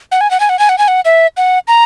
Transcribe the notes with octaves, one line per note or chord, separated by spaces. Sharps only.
F#5
G#5
F#5
G#5
F#5
G#5
F#5
G#5
F#5
E5
F#5
A#5